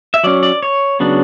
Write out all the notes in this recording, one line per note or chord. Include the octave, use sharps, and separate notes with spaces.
E5
F#3 C#4 D5
D5
C#5
C#3 F#3 B3 D4